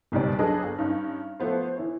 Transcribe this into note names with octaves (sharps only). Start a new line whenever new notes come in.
F#1 C2 G#2 B2 G3 D5
F#3 D4 G#4 A4 B4 D#5
G1
G2 C#4 D#4
F3 A3 B3 C5
E3 E4 C#5